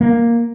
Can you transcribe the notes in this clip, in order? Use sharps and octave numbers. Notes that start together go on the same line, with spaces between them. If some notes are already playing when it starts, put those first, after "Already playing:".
A#3